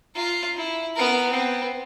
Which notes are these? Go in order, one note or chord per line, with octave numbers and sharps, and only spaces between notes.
F4 A#5
E4
B3 A#4
B3 C4